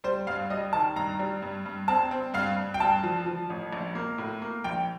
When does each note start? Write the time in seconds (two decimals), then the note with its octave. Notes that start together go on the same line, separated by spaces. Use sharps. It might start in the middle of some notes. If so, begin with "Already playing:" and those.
0.04 G3 C5
0.27 G2 F5
0.50 G3 D#5
0.73 D#3 A5
0.96 G2 A#5
1.19 G3
1.42 G2
1.66 G2
1.88 C4 A5
2.11 C4
2.34 G2 F5
2.57 G2
2.74 G5
2.80 G2 A5
3.03 F3
3.26 F3
3.50 A1
3.73 A#1
3.95 A#3
4.18 A2
4.42 A#3
4.64 A#1 G5